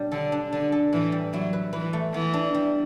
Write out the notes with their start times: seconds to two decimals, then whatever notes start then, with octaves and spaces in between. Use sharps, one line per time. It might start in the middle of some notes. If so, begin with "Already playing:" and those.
Already playing: B2 F#3 G3 D4
0.12 D3 A4
0.32 D4
0.52 D3 D4
0.72 A4
0.93 A2 E3
1.12 G3
1.33 F#3 E4
1.53 B4
1.73 E3 B4
1.93 A3
2.14 E3 B3
2.34 D4
2.55 G3